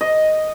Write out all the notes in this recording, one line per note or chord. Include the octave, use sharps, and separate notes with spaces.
D#5